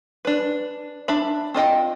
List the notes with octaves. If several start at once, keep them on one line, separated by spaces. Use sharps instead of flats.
D4 B4
D4 E5 B5
C4 F4 D#5 G5